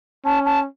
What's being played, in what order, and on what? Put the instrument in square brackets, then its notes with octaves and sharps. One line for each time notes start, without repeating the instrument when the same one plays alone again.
[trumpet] C#4 [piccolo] A5
[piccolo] A5